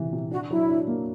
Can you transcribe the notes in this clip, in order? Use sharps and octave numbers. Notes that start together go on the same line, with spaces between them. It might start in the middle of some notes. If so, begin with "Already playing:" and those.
Already playing: C3 E3
C3
D4 F#4
F#3 E4
D4
A#3